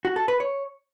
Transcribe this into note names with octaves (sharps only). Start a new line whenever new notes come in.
F#4
A4
B4
C#5